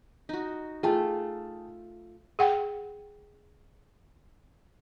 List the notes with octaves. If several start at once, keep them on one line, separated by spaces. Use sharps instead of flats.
D#4 F#4
A3 F4 G#4 G5 A5
G#4 F#5 G5